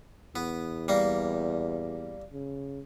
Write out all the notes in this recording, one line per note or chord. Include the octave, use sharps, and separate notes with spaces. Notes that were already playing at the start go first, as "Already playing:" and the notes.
E2 B3
G3 A#3
C#3